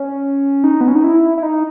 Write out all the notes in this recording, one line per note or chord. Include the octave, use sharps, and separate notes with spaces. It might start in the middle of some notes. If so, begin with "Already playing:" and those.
Already playing: C#4
D#4
B3
C#4
D#4
E4
E4
D#4